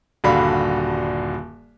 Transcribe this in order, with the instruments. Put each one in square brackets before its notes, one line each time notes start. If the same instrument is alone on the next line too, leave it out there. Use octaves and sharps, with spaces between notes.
[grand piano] D#1 G2 D3 F#4 F5 B5